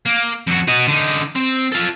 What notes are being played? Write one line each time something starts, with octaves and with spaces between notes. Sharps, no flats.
A#3
F2 F#4
F#4 D#5
D3 D#4
C4
F4 A4